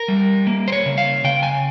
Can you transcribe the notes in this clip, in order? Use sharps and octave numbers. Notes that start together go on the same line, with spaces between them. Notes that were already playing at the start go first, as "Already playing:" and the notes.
Already playing: A#4
G3
A#3
C5
C#5
C#3
F5
C#3 G5
G#5